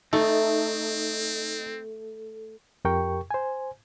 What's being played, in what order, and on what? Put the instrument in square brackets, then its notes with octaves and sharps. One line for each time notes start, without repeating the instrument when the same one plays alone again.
[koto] A3 [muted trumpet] C4 [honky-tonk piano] D#4 [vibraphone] A4
[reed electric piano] F2 G4 A#4 G5 C#6
C5 G#5